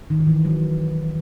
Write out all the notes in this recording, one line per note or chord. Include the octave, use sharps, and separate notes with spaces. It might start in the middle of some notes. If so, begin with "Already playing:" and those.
D#3
D#3
E3
F#3